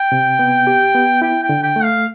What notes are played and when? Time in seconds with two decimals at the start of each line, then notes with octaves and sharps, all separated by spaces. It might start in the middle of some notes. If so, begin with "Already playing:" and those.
Already playing: G5
0.12 C3
0.39 B3
0.67 G4
0.95 B3
1.22 E4 G5
1.43 G5
1.49 D3
1.63 G5
1.76 A3
1.83 F5